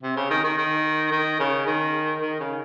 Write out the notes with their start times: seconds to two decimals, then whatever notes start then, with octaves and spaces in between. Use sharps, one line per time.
0.03 C3
0.17 C#3
0.30 D#3
0.44 D#3
0.57 D#3
1.12 D#3
1.39 C#3
1.67 D#3
2.21 D#3
2.40 C#3